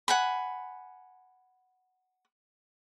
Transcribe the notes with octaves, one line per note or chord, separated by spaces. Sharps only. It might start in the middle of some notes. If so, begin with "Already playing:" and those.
F#5 G#5 B5